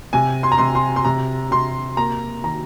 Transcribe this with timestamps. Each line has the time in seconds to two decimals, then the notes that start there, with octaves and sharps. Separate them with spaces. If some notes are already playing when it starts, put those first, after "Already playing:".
0.13 C3 G#5
0.43 C6
0.52 A#5
0.58 C3 C6
0.75 C6
0.96 C6
1.05 C3 A#5
1.51 C3 C6
1.97 A#3 A#5
2.44 D#3 A#5